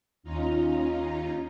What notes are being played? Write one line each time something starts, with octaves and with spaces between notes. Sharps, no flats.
D#2 C#4 D#4 F4 A#5